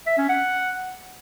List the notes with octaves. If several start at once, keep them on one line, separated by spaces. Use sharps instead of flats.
E5
C#4
F#5